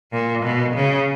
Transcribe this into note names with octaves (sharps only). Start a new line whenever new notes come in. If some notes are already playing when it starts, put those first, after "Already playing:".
A#2
B2
C#3